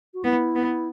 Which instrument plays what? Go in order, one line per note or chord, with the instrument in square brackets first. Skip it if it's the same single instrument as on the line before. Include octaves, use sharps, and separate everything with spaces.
[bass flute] F#4
[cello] B3 [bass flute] E4
[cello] B3